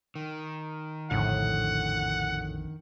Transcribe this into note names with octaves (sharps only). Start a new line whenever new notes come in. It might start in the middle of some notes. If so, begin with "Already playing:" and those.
D#3
A#1 F2 A2 D3 F#5